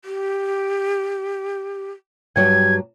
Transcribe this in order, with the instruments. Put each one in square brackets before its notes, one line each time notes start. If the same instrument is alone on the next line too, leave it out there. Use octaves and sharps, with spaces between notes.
[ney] G4
[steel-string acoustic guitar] G2 F#3 G3 [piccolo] G#6